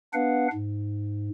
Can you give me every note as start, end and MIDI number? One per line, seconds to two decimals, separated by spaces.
0.14 0.48 59
0.14 0.48 62
0.14 0.48 71
0.14 0.48 77
0.14 0.48 78
0.53 1.29 44